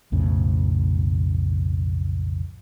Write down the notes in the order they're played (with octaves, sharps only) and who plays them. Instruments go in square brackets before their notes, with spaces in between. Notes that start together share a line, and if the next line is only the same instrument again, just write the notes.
[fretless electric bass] B1 F2 A2 C#3